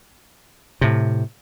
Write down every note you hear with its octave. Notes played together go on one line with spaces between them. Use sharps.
A2 C3